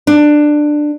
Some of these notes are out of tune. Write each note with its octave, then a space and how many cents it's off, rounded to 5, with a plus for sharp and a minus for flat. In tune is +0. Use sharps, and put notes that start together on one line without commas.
D4 +15